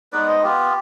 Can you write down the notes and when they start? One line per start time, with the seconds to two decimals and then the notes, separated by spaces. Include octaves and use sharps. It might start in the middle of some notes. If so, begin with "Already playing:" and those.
0.12 G#3 B3 D#4 B4 D5
0.28 C5 D#5
0.43 B3 F4 G4